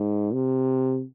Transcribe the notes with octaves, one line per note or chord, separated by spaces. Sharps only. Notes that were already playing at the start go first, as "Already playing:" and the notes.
Already playing: G#2
C3